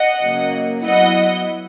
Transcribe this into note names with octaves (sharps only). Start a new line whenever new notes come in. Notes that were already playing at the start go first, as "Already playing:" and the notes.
Already playing: D#5 F#5
C#3 F#3 A#3
F#3 B3 E4 D#5 F#5